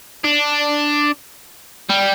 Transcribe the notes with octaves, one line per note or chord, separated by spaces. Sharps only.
D4
G3